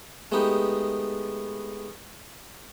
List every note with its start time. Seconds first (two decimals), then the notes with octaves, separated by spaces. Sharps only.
0.32 G#3 A3 B3 D#4 G4